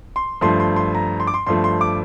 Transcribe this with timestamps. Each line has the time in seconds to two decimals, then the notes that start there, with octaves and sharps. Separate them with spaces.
0.16 C6
0.41 G2 F3 A3 C6
0.60 C6
0.76 C6
0.95 A#5
1.20 C6
1.27 D6
1.34 C6
1.46 G2 F3 A3 C6
1.64 C6
1.81 D6